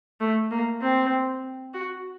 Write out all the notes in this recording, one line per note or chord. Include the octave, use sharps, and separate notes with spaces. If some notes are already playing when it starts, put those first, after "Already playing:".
A3
A#3
C4
F#4